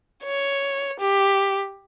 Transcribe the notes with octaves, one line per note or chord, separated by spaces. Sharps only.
C#5
G4